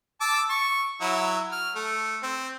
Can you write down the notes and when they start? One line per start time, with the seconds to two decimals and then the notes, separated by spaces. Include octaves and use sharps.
0.21 A5 D6 E6
0.50 C#6
1.01 F#3 E4
1.52 F6
1.76 A3
2.23 C4